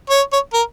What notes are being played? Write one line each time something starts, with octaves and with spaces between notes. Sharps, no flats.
C#5
C#5
A#4